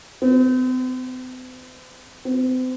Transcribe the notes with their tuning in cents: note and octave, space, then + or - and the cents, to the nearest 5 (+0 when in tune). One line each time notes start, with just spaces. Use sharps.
C4 -45
C4 -40